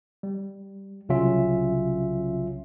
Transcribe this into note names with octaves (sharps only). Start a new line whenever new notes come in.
G3
C2 C#3 F#3 C#4 F4 E5